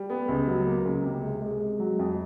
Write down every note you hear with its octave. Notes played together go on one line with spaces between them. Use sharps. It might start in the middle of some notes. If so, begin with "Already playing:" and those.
Already playing: G3
B3
C#2
F#3
A#3
C#2
C3
G#3
G#3
G#3
F#3
F2